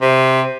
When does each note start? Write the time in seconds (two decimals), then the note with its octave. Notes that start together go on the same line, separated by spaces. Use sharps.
0.01 C3